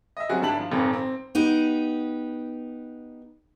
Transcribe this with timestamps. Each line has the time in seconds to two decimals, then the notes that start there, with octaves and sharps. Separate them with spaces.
0.17 D#5 E5
0.29 F#3 G3 C4 C#4 F#4 G#4
0.42 G#1 D4 E4 G4 A5 F#7
0.59 F3
0.72 D#1 G#1 F2 C4
0.93 C4
1.35 B3 D#4 G4